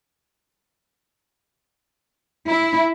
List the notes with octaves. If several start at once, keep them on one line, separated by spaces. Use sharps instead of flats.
E4